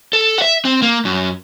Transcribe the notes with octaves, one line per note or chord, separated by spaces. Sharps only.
A4
E5 F#5
C4
A#3
F#2